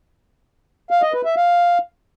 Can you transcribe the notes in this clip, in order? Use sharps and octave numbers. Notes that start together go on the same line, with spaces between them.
F5
D#5
B4
E5
F5